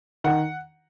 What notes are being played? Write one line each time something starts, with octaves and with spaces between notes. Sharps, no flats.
D#3 F#5